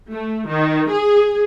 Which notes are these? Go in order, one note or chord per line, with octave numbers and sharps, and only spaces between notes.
A3
D#3
G#4